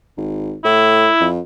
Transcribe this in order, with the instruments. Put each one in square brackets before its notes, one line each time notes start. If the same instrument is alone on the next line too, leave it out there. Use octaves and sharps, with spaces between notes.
[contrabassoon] G#1
[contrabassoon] A2 [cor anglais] E4
[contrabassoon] F2